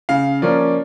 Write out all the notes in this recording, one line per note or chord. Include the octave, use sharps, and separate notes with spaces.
C#3 F5
F3 A#3 C#4 D5